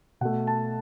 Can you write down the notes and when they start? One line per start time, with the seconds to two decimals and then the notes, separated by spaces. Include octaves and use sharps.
0.21 B2 A3 F#5
0.47 A5